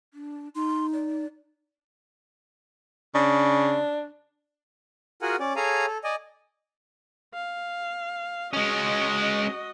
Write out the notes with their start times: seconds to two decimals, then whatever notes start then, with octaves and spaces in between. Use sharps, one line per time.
0.14 D4
0.55 D#4 C6
0.93 D5
3.15 C#3 D4
5.22 F4 F#4 G#4 A#4 F#5 G#5
5.40 C#4 D5
5.56 G#4 A4 C#5 F5 G#5 A#5
5.86 A4
6.04 D5 D#5 G#5
7.34 F5
8.53 G#3 C#4 F#4 D#5